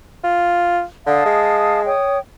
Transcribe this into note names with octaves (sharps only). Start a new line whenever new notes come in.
F4
D3 F5 A5 D#6
G#3
C#5 G5 D#6